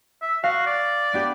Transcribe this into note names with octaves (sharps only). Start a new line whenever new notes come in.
E5
F#4 F5
D5
B3 D4 G4